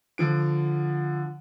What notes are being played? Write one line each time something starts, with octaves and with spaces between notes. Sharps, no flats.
D3 F3 D7